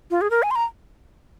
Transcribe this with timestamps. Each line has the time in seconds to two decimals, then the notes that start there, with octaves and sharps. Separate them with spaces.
0.11 F4
0.21 G#4
0.31 A#4
0.43 G#5
0.51 C6
0.55 A#5